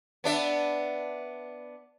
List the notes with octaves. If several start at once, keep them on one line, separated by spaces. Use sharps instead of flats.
B3 D4 E5